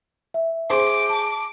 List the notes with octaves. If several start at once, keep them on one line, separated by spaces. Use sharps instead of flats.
E5
G#4 C5 D6
A5